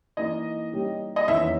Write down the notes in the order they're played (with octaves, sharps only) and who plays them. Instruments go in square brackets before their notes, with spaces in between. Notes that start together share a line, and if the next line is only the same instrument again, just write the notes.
[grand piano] E3 A#3 D#4 [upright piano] D#5
[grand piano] G3 A#3 D#4 G4 C#5
[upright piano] D#5
[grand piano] E2 D#3 A#3 C#4 E4 [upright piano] E5